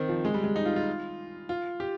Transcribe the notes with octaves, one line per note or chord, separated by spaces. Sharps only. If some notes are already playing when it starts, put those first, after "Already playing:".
Already playing: D#3 C4
F3
G#3
G3
G#3
D#4
F4
F4
F4
G4